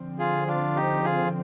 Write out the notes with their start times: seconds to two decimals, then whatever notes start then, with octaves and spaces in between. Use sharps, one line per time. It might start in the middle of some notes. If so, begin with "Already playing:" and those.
Already playing: D3 F3 C4
0.19 F4 G#4
0.47 D4 F4
0.76 D#4 G4
1.04 F4 G#4